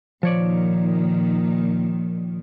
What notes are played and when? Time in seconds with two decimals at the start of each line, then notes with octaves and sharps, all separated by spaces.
0.23 A#2 D#3 F3 C#5 D5